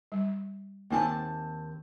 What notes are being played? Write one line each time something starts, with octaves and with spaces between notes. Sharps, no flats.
G3
D#2 A#3 C4 D#4 G#5 A5